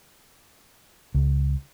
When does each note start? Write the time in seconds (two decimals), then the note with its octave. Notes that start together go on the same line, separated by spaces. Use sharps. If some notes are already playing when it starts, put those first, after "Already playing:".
1.14 C#2